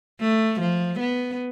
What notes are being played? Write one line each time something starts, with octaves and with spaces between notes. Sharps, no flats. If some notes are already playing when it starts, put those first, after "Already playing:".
A3
F3
B3